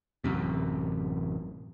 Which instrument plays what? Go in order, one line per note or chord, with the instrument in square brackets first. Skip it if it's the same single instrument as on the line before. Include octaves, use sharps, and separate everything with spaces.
[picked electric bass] A1 F#2 C3